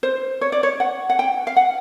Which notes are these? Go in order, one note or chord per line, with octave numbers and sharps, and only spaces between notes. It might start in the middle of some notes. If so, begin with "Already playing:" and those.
C5
C#5
D5
C#5
F#5
F#5
G5
F5
F#5